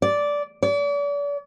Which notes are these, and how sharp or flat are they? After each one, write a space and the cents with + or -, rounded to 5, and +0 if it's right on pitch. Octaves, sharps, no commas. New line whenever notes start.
D5 -10
D5 -40